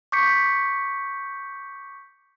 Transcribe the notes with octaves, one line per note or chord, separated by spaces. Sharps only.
C#6 D6 G6 B6 C#7